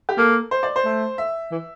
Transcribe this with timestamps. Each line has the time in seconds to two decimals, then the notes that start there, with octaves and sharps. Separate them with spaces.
0.09 G4
0.17 A#3 A4
0.51 C5
0.63 D5
0.76 C5
0.85 A3
1.18 E5
1.52 E3